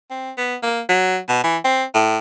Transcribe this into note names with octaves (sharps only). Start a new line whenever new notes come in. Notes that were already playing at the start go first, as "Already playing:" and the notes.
C4
B3
A#3
F#3
B2
E3
C4
A2